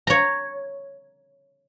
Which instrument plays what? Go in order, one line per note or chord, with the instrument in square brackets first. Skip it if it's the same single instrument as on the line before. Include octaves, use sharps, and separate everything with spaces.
[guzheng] C#5 A#5